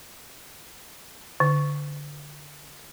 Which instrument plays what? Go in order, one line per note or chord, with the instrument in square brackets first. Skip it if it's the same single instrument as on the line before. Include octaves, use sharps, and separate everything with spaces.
[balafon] D3